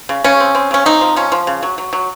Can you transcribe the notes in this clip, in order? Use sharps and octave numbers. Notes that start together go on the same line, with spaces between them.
C#3
C#3 C#4
C4
C4
C#3 C#4
C4 D#4
F3
F3 C#4
F3
C#3
F#3
F#3
F#3